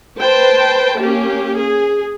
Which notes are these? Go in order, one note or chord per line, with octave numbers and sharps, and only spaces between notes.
B4 C5 G5 A5
A#3 C#4 G4
G#4